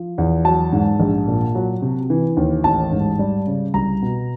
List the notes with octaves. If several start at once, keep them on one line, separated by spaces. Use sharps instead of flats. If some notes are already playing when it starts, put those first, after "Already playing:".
Already playing: F3
E2
F#3 A5
G#2
A#1
A#2
F#3
C3
E3
D#2
A1 A5
G#2
G3
C#3
C2 A#5
B2